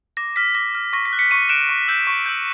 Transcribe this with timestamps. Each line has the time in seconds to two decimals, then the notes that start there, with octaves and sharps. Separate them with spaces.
0.17 D6 A#6
0.36 F6 B6
0.55 D6 A#6
0.75 F6
0.93 C#6 A#6
1.05 B6
1.13 F#6
1.19 B6 C#7
1.31 C#6 C#7 D#7
1.49 F#6 D7 E7
1.69 C#6
1.88 E6 G6
2.07 C#6
2.26 E6 G6